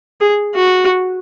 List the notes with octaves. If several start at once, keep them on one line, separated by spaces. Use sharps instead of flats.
G#4
F#4